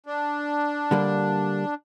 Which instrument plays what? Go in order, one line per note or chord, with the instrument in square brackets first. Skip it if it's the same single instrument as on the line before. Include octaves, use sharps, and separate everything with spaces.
[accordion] D4
[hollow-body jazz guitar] D3 G3 A#3